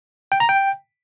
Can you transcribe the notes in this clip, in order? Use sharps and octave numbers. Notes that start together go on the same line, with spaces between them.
G5
A#5
G5